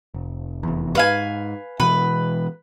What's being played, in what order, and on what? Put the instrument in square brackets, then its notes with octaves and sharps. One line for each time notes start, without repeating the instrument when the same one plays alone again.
[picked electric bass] F1
F1 E2
[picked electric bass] G#2 [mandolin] B4 F5 G#5
[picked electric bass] B2 E3 G#3 [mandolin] B4